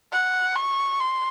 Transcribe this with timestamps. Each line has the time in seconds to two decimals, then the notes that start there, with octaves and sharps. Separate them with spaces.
0.12 F#5
0.56 C#6
1.00 C6